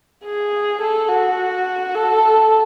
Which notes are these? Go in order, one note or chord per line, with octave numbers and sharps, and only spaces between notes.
G#4
A4
F#4
A4